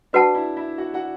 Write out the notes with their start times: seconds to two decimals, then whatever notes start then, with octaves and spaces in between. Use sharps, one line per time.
0.13 D4 F#4 B4 D5 F#5 A5
0.35 E4 E5
0.57 E4 E5
0.78 F#4 F#5
0.94 F#4 F#5